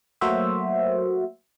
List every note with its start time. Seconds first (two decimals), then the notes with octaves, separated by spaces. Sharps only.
0.21 F#3 A3 A#3 F#4 C5 E5